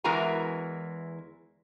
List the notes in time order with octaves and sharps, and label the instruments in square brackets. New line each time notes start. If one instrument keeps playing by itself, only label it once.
[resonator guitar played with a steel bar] E2 E3 G#3 F#4 A#4 A#5